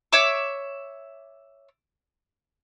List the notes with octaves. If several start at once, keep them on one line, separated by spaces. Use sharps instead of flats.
C#5 E5 D6